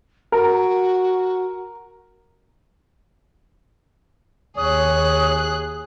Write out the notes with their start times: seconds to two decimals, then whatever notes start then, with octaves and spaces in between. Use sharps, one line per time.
0.32 F#4 A#4
4.57 D#2 G#4 C#5 D#6 F#6